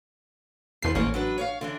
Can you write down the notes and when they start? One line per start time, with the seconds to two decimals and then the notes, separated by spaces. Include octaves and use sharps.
0.82 E2 C#3 F3 B4 C7
0.95 A1 G#2 A#3 C#4
1.14 F#3 D4 B4
1.38 C#5 D#5 F5
1.61 D3 E3 D4